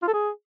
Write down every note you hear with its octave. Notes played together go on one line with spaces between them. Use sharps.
F4
A4
G#4